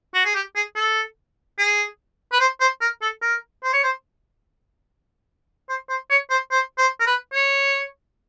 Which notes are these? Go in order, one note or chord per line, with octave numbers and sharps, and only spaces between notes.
F#4
G#4
G4
G#4
A4
G#4
B4
C5
C5
A#4
A4
A#4
C5
C#5
C5
C5
C5
C#5
C5
C5
C5
A#4
B4
C#5